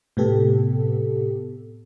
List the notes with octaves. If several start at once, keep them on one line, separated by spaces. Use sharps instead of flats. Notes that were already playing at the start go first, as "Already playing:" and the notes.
A2 C3 B3 G4 A4